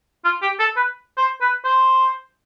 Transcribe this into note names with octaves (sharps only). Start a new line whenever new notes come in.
F4
G4
A4
B4
C5
B4
C5